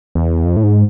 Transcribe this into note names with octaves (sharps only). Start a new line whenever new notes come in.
E2
F2
A2
G#2